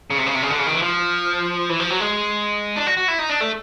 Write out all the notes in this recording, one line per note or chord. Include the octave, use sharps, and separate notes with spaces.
C#3
C3
C#3
C3
C#3
D3
C#3
D#3
E3
F3
E3
F3
F#3
G#3
D4
F#4
F#4
E4
D#4
D4
A3